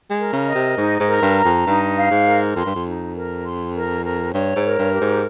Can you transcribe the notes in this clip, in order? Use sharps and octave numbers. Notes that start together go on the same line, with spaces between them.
G#3
A#4
C#3
D#5
C3
G#2 D#4
G#2
A#4
G2
A#5
F2
G2 D#4
F5
G#2
A#4
F2 C6
G2
F2
D#4
A#4
C6
A#4
A#4
G2 C#5
G#2
A#4
G2
G4
G#2